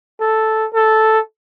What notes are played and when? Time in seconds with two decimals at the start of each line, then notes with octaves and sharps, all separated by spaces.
0.20 A4
0.73 A4